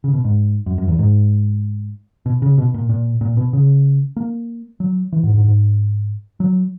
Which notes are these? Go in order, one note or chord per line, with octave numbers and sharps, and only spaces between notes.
C#3
B2
G#2
F#2
F#2
E2
G#2
B2
C#3
B2
A#2
A#2
A#2
B2
C#3
A#3
F#3
E3
G#2
G#2
G#2
F#3